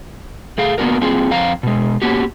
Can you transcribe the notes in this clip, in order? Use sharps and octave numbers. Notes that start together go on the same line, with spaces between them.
A3 G#4 F5
A#3 B3 D4 F#4 A#4
A#3 C4 F4 G#4
F2 C4 F5 A#5
B2 G#3
A#3 B3 C#4 F#4 G4